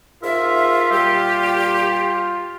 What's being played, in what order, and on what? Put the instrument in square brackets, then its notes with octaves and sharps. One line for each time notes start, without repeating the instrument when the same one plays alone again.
[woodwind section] G#2 A#4 E5 [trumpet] F4
[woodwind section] A#2 G3 G4